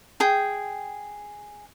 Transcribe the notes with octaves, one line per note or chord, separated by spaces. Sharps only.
G#4 G5